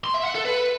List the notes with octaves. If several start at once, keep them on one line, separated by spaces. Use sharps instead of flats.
C6
E5
F#5
A4
B4